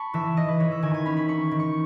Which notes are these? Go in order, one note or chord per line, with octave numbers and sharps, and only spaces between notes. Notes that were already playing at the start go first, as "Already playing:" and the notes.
Already playing: A5 B5 C#6
E3 E5
E3 D#5
B4
E3 C#5
E5
D#3 G#5
G#5
C#4 B5
B5
C#4 C#6
D#3
C#6